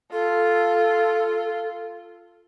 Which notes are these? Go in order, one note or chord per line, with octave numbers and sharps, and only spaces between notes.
F4 A4